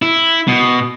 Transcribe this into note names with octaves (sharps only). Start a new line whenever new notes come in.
E4
B2